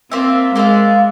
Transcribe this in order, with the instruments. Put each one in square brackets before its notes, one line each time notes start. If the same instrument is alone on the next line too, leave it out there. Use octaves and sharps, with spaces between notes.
[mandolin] A#3 F4 C5 E5 [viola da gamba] C4
[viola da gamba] G#3 [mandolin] A#3 F4 C5 E5